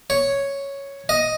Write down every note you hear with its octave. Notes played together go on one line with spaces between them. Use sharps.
C#5
D#5